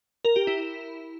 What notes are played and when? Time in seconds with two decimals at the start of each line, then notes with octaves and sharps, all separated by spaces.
0.25 A#4
0.36 G4
0.47 E4